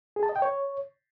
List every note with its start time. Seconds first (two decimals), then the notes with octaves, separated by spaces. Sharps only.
0.16 G#4
0.23 A5
0.29 D#5
0.36 G5
0.42 C#5